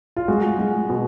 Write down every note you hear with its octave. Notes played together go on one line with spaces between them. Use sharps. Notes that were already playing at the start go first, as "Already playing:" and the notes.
F4
G#3 F#4
G#3
B2